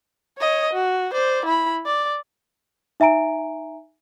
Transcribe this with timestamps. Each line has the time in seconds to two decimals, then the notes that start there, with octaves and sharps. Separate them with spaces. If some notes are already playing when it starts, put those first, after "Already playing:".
0.38 C#5 D#5
0.73 F#4
1.13 C5 D5
1.45 E4 B5
1.86 D5
3.00 D#4 E5 G#5 A#5 D7